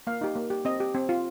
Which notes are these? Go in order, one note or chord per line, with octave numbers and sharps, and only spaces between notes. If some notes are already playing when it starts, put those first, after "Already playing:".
A#3 F5
D#4 G4
A#3
G4
C4 D#5
G4
C4
F4